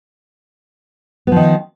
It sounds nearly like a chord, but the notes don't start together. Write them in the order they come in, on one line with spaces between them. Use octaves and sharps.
B3 F3 D#3